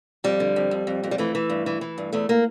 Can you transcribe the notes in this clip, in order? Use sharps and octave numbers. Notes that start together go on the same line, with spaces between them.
F2 G3
D3
F2
F2
F2
F2
G3
E3 A3
E3
G2
E3
E3
G2
E2 A3
A#3